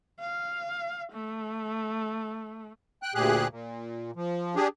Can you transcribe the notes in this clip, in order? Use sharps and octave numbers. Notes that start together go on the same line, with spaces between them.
F5
A3
G5 F#6
D2 A#2 G4 G#4 F#6
A#2
F3
D4 G4 G#4